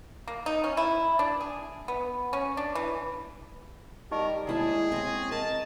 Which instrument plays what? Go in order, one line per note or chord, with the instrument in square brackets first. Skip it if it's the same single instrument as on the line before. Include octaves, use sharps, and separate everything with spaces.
[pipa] A#3
D#4
C#4
E4
D4
G#4
B3
C#4
D4
E3
[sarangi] G3 [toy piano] D#4 G4 D#5 [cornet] A#4
[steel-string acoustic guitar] D#2 E4 A5 [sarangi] G#3 [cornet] G#4
[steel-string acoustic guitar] C4 C#4
[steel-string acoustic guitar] A#4 [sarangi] D#5 [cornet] A5